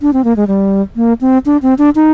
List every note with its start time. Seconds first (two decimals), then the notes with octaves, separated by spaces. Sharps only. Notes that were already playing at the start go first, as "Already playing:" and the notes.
0.02 D4
0.13 C4
0.24 A#3
0.36 G#3
0.47 G3
0.96 A#3
1.21 C4
1.46 D4
1.63 C4
1.78 D4
1.95 D#4